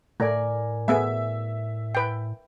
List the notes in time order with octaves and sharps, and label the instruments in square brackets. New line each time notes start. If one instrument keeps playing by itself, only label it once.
[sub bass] A2 [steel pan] A3 [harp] A#4 D5 G#5
[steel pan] A3 B3 G#4 [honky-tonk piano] E5
[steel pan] B4 G5